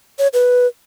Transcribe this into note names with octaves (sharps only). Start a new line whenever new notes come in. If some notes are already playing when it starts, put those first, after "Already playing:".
C#5
B4